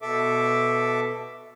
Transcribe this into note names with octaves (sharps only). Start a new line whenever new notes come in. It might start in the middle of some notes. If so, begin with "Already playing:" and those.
B2 A4 E5 D6